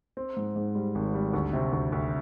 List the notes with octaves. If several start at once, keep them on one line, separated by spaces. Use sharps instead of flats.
C4
G#2
G#2
G3
G#1
G3
D2
C3
D2
D2